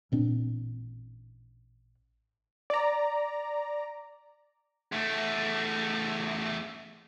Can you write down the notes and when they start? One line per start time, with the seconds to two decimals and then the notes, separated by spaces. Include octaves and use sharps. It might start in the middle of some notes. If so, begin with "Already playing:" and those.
0.12 A1 A#2 C4 D4
2.70 D5 A#5
4.92 E2 A3